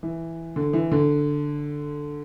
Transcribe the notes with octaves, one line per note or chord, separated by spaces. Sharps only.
E3
D3
E3
D3